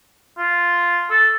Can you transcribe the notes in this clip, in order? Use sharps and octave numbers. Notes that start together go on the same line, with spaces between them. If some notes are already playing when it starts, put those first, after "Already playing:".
F4
A4